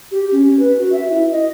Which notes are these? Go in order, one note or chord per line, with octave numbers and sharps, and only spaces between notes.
G4
C#4
C#4
B4
F#4
E5
E4
D#5